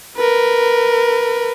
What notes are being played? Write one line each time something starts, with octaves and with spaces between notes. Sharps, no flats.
A#4 B4